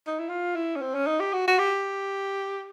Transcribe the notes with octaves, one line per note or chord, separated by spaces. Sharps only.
D#4
E4
F4
E4
C#4
C4
C#4
D#4
G4
F#4
F#4
G4